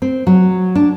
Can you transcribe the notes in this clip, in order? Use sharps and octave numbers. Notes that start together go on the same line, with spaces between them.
C4
F#3
D4